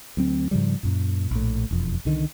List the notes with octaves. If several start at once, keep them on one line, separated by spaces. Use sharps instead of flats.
D2 F#3 C4
G#2 C#3 F3 G3
F#2 A#2
A#1 A2
E1 F2
C2 D3 D#3